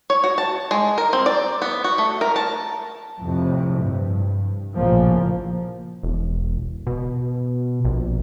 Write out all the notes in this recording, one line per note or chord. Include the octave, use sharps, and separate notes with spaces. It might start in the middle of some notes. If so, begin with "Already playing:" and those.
C#5
F#4
A5
G#3
A#4
C4
D5
B3
F#4
A3
A#4
A5
F2 A2 C3
G2
A1 A#2 C#3 F3 A#3
E1
B2
A#1